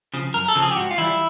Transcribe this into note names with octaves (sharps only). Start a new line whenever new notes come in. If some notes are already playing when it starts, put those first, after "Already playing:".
C#3 F3
F#2 A#4
A4
C#3 F3
G#4
G4
G#2 F#4
F4
E3 G3 E4